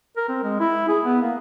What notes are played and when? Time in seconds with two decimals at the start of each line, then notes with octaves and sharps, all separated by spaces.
0.17 A#4
0.28 C4
0.43 G#3
0.60 E4
0.88 G#4
1.04 B3
1.21 A#3